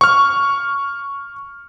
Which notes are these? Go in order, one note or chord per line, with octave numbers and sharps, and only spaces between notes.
C#6 F6